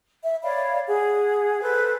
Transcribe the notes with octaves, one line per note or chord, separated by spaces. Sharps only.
E5
C#5 D5 F5 B5
G#4 F#5
A4 B4 C5